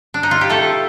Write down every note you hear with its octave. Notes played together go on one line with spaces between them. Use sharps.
D4
D#4
F4
G4
A3 A4